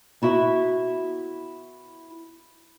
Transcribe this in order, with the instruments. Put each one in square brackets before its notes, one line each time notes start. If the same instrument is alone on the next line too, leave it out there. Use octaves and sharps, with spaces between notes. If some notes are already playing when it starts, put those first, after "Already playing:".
[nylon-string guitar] B3 E4 F#4 E5